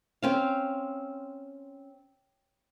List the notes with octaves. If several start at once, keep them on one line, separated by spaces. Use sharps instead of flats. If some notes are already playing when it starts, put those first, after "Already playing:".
C4 C#4 F5